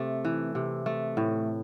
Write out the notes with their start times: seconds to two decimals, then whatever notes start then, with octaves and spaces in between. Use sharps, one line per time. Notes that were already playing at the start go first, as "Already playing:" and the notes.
Already playing: C3 A3
0.25 E3
0.55 C3
0.86 A3
1.17 A2